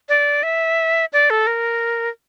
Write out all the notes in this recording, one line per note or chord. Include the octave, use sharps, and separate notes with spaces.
D5
E5
D5
A4
A#4